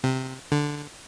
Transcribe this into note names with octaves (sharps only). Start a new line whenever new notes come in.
C3
D3